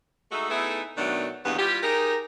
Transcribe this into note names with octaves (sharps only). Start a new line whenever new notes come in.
G#3 A3 D#4 F#4 E5
A3 B3 D#4 E4 G#4 A4
B2 D#3 F#3 A3 B3 D4
E2 G2 D#3 F#3 A#3 B3
G3 E4 F4 G4
D#4 G4 G#4 A#4